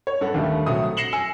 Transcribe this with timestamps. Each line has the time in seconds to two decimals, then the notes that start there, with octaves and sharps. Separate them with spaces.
0.07 C#5
0.21 G2 A4 F#5
0.34 D#2 D3 G3 A3
0.66 A#1 C3 F#3 A3 F#4 D#6
0.97 A#6 C7 C#7 E7 F#7 G7
1.13 G#5 E6 C#7